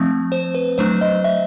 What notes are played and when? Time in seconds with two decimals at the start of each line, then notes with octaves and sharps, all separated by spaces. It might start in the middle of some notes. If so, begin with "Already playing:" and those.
Already playing: F3 A3 C4
0.32 C5
0.55 B4
0.78 F#3 A3 D4 C5
1.01 D#5
1.24 E5